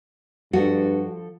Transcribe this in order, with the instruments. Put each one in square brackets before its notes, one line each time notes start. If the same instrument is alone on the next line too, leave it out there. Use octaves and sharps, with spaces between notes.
[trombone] G2 [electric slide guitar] F3 A4 [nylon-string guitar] F#4